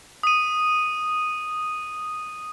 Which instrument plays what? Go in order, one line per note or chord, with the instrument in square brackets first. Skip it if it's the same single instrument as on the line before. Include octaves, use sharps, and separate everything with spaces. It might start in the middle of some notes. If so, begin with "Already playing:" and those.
[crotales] D#6 D#7